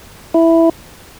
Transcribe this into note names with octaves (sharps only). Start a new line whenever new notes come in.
E4